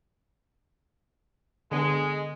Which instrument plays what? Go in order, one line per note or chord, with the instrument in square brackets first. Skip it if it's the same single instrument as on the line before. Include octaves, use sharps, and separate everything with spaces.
[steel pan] D3 B3 [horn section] G#3